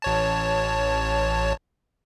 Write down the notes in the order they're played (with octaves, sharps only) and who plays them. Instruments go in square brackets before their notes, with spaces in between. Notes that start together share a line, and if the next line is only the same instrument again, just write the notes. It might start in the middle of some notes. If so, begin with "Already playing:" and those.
[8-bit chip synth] A1 C#5 A5